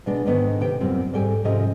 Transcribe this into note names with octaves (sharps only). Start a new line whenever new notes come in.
B2 G#3 D4
G#2 D3 D#3 B3 D#4
C3 G5
F#2 A#2 G3 C4
G#2 G3 A4 G5 G#5
G#2 C3 F3 C#4 D#5